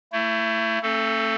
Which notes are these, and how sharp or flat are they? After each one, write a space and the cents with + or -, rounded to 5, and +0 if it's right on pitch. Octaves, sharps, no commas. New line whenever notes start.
A3 +30 E4 +15
A3 +30 C#4 -45 A4 +0